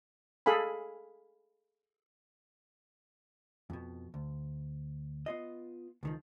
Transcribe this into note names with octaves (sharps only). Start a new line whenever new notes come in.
G#4 A4 F5 G#5 B5
F2 B2
D2
B3 F4 D#5
C#2 D#3 F3